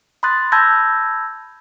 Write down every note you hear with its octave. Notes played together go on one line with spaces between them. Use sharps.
B5 C6 D#6 F#6 A6
A5 B5 E6 G6 G#6 A#6